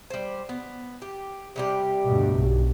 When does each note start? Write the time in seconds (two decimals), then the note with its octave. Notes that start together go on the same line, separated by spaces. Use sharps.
0.10 G3 C5
0.49 B3
1.02 G4
1.56 C3 G3 G4
2.06 D2 G2 B2
2.35 B1